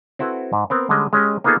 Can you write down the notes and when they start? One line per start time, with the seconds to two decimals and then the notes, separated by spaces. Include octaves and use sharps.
0.19 C4 E4 F#4 A4 B4
0.53 G#2
0.70 B3 C4 A#4
0.89 D3 G3 G#3 C#4 D#5
1.13 G#3 C#4 G4 D#5
1.44 A#3 B3 D#4 F4 G#4 A4